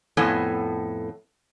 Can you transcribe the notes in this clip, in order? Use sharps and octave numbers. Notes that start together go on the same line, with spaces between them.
F2 A2 B3 A4 C#5 G#5